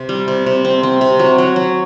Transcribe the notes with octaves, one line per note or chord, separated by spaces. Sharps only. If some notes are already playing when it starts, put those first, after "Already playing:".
Already playing: C3
G3
C3
C3
C4
C4
C3
F#3
F#3
F#3